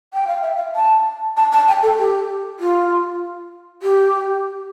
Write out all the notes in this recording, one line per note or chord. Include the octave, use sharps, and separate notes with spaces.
G5
F5
E5
F5
A5
A5
A5
G5
A4
G4
F4
G4